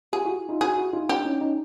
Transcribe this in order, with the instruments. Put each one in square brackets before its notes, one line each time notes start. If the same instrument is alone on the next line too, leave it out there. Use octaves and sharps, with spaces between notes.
[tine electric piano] F4 G4 [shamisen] G#4
[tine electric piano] E4 F#4
D#4 F4
[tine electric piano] E4 F#4 [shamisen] G#4
[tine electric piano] E4 F#4
D#4 F4
[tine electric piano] D4 E4 [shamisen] G4
[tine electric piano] C#4 D#4
C#4 D#4